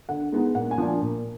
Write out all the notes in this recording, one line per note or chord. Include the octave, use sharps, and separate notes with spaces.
D3 F#5
G#3 B3 D#4
A#2 F#5
G#5
F3 A#3 D4
A#2